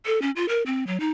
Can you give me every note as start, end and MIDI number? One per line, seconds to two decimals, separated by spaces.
0.06 0.22 69
0.22 0.31 61
0.36 0.46 65
0.49 0.62 70
0.66 0.87 60
0.87 0.98 54
1.00 1.12 63